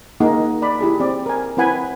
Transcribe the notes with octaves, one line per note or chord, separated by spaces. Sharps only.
A#3 D#4 G#4 F#5
D5 B5
E4 G4 G#4 B5
C4 D5
A#4 G#5
C4 E4 B4 F#5 G#5 B5